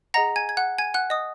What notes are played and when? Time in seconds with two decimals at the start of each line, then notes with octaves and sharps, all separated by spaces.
0.14 G#4 D#5 F#5 A#5 A#6
0.36 G#5 G#6
0.49 G#6
0.57 F#5 F#6
0.78 G#5 G#6
0.94 F#5 F#6
1.10 D#5 D#6